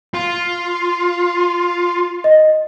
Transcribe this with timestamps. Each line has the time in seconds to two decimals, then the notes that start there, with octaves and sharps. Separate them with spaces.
0.14 F4
2.24 D#5